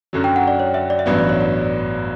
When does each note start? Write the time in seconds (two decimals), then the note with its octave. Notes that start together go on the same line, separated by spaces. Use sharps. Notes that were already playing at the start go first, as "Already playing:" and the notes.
0.13 F#2 D3 F#3
0.24 G5
0.36 F#5
0.47 D5
0.60 C#5
0.74 E5
0.90 D5
0.99 E5
1.06 A1 G2 F#3 B3 D5
1.18 D5
1.29 C#5
1.41 D5